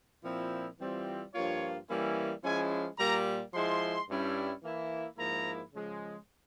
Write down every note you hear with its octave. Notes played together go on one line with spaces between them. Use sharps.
A#2 F3 C4 E4
E3 G3 C4 F4
G2 F3 A#3 F4 C#5
E3 G3 A#3 C#4 E4
F3 G#3 C#4 E4 G#5
A#2 G3 A#3 A#5
F3 G#3 E4 C6
G2 G3 C#4 E4
E3 A#3 E4
G#2 F3 A#3 E4 A#5
C#3 F3 G#3